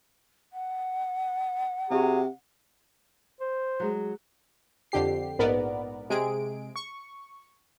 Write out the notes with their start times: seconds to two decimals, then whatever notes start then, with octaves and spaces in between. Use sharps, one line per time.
0.53 F#5
1.91 C3 F#4 G#4 A#5
3.41 C5
3.80 F#3 G#3
4.92 F2 D3 G4 C7
5.39 A#1 G#2 B3 A#4 D5
6.10 C3 G#3 G#4 D7
6.76 C#6